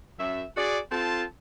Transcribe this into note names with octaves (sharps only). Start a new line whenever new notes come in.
F#2 E5
F#4 G#4 D5
C4 F4 A4 A5